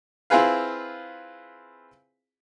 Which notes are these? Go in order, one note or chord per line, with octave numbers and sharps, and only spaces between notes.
C4 E4 F4 G#4 B4 F5